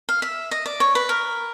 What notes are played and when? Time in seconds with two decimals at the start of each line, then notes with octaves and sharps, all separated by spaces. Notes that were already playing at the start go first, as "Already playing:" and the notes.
0.09 F5
0.22 E5
0.51 D#5
0.66 D5
0.80 C#5
0.95 B4
1.09 A#4